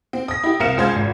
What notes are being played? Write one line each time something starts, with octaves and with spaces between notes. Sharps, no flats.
C4
D#6 A#6
E4 G4
C2 C4 A#4 F5 C#7 E7
C#2 G#4 C5 F5 G#6
G#1